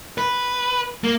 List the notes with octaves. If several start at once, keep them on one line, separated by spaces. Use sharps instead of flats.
B4
A#3